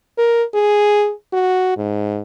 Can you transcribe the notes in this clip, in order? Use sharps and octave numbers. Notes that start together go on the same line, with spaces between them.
A#4
G#4
F#4
G#2